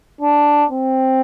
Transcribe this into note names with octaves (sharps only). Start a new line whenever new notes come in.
D4
C4